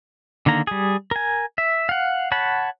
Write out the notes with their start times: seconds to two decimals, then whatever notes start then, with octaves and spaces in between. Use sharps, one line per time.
0.46 D3 D#3 A#3 A#5
0.67 G3 G#4
1.11 A#4 G#5
1.58 E5
1.89 F5 F#5
2.32 C#5 F#5 A5 B5